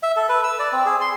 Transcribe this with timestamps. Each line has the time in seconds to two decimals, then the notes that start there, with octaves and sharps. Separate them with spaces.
0.03 E5
0.16 A4
0.29 B4
0.43 E6
0.59 D5
0.72 C4
0.86 G#4
1.01 C6